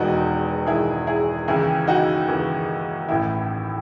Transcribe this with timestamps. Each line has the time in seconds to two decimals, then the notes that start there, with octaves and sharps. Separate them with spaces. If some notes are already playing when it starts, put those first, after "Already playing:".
Already playing: E1 E2 D#3 D#4 F#4
0.67 E1 E2 D#3 E4 G#4
1.07 E4 G#4
1.48 D#2 C#3 E3 E4 G#4
1.87 D#4 F#4
2.28 D#2 C#3 E3
3.09 A1 A2 E3 E4